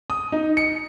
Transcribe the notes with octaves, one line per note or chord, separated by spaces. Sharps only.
D#6
D#4
C#7